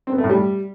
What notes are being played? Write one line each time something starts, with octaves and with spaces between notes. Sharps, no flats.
C4
B3
A3
A2
G3